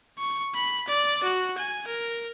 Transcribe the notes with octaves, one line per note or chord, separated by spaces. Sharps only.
C#6
B5
D5
F#4
G#5
A#4